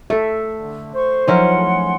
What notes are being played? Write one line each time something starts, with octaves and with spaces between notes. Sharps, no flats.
A3 A4 E5
D3
C5 C#6
F3 F#3 C#4 D#4 E4 A#4 F#5 C6
A3 G#4